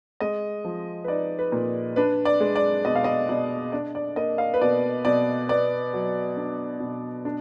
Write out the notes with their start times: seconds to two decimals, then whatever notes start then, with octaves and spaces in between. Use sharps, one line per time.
0.20 G#3 D#5
0.65 F3
1.04 B4
1.08 D#4 D5
1.39 B4
1.52 A#2
1.96 D4 B4
2.25 D5
2.40 G#3
2.56 D5
2.85 B2 D#5
2.95 F5
3.04 D#5
3.29 B2 D5
3.72 D4 D5
3.95 D5
4.16 A#3 D#5
4.38 F5
4.54 B4
4.61 B2 D5
5.05 B2 D5
5.49 B3 D5
5.93 F#3
6.37 D4
6.80 B2
7.25 D4